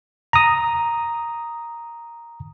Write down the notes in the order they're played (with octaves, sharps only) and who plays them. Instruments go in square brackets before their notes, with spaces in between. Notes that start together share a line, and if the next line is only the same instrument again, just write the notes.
[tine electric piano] A#5 D#6